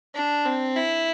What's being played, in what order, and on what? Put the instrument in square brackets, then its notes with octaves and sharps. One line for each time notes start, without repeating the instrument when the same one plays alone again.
[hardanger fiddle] D4
C4
E4